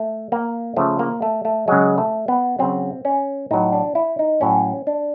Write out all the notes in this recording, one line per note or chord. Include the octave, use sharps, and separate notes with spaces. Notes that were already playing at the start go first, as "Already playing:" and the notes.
Already playing: A3
A#3
C#3 F3 A3
A#3
A3
A3
C#3 F#3 G#3
A3
B3
C#3 F#3 C4
C#4
A2 F#3 D#4
D4
E4
D#4
A2 F#3 C#4
D4